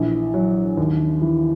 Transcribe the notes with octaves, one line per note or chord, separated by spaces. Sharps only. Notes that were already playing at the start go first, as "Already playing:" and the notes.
Already playing: A#1 E3
F#3
D#2
E3